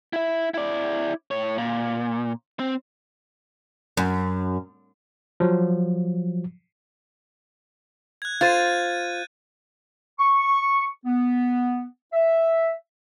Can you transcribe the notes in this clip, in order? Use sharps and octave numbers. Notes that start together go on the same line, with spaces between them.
E4 E5
E4 D5
A2 C#5
A#2
C4
F#2
F3 F#3
F#6 G#6
F4 C5 G6 A6 D#7
C#6
B3
E5